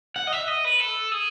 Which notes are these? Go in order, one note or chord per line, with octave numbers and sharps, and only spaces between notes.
F#5
D#5
E5
D#5
B4
A4
G#4